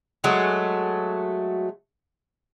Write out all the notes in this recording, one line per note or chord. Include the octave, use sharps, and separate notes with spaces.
F#3 G#3 A3 F#4